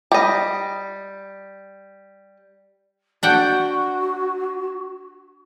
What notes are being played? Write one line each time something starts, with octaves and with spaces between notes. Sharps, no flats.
G3 D#5
D4 F#4 F#5 G5